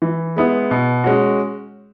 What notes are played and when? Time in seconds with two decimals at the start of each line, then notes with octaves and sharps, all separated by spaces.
0.02 E3
0.36 G#3 B3 E4
0.71 B2
1.04 G#3 C#4 F#4